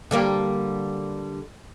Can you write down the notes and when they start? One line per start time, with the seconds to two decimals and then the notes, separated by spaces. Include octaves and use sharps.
0.11 D3 G3 A#3